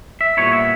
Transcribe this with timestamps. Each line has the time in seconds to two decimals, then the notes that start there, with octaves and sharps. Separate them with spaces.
0.21 E5
0.37 A#2 G3 B3 E4 C#5
0.53 E5